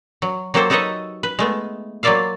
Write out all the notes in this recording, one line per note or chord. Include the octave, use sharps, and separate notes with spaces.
F#3
F#3 A#3 G4 A4 C5
D#4 A4 B4 C#5 D#5 E5
B4
G#3 A3 B3
F#3 A#3 F4 D5 E5 F5